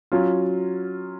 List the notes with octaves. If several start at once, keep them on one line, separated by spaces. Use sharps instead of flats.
F#3 C#4 F4